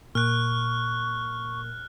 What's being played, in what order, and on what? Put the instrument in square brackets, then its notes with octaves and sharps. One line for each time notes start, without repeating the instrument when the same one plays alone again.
[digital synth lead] A#2 [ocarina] C#6 [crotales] F6 F#6